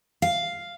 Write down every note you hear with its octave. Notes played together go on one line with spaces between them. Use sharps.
F5